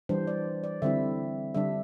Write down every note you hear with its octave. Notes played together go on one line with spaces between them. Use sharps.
E3 G3 D4 C5
D5
D5
D3 G3 C4 E4 E5
D3 G3 D4 E5